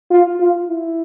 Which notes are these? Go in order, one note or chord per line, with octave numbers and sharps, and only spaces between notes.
F4
F4
E4